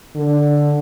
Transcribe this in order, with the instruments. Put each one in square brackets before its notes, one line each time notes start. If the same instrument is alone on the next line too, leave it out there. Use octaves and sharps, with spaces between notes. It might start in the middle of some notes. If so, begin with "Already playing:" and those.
[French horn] D3